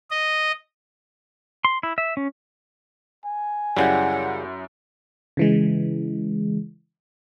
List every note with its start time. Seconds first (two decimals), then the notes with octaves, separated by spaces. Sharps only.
0.11 D#5
1.65 C6
1.83 E4
1.98 E5
2.17 C#4
3.25 G#5
3.77 F#2 C#3 G3 E4 F#5 G6
5.37 C#3 E3 G#3